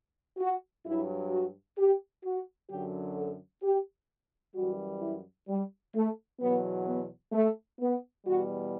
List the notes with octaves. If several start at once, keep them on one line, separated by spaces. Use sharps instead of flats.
F#4
G2 F#3 E4
F#4
G4
F#4
F#2 D3 F#3 G4
A4
G4
F#2 E3 G3 F#4
E4
G3
A3
E2 B2 F#3 B3
B3
A3
B3
E2 B2 G3 F#4